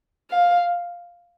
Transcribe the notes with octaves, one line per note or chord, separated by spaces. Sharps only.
F5